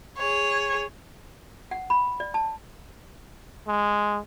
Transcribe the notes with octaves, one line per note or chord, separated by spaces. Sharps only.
G#4 C#5
F#5
B5
D5
A5
G#3